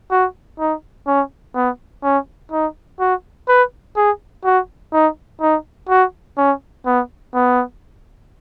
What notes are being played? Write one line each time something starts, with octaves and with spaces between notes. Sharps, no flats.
F#4
D#4
C#4
B3
C#4
D#4
F#4
B4
G#4
F#4
D#4
D#4
F#4
C#4
B3
B3